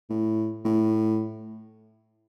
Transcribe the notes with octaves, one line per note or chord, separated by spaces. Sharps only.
A2
A2